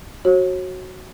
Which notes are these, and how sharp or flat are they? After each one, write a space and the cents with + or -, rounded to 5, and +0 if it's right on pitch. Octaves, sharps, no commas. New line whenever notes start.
F#4 +0 C#5 -35